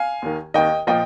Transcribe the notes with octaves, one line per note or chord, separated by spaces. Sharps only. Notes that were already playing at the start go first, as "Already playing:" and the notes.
Already playing: F5 G#5
D#2 D#3
D#2 D#3 D#5 G5
A#2 F3 D#5 G5